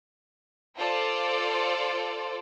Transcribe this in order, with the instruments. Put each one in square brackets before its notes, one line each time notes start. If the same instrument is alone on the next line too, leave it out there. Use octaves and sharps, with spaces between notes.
[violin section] F4 A4 C5 D5